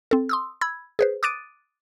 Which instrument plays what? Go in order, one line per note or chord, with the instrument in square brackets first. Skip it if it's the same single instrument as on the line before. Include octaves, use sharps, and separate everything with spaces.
[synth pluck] C4 A4
C6 D#6 E6
B5 E6 G#6
G#4 B4 C5
D6 D#6 F#6 A6 D7 D#7